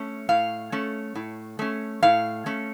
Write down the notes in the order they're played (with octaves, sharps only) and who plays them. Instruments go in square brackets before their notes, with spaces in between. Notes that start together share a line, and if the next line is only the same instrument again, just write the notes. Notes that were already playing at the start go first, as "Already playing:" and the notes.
Already playing: [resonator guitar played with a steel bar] A3 C#4
A2 F5
A3 C#4
A2
A3 C#4
A2 F5
A3 C#4